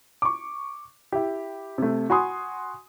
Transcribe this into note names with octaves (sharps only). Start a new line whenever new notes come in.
C#6 D6
E4 G4
C3 A3
F#4 F#5 G#5 B5 C6 D#6